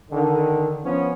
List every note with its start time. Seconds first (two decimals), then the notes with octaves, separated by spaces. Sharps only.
0.11 D3 D#3
0.84 F3 B3 C#4